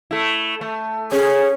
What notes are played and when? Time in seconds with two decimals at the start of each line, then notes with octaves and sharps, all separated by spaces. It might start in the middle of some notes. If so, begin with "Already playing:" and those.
0.11 A3 E4
0.61 A3
1.12 C#4 G#4